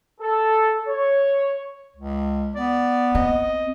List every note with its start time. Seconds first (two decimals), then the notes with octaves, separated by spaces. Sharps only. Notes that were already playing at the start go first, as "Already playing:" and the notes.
0.21 A4
0.88 C#5
1.96 C#2
2.55 B3 D5
3.15 C4 D#5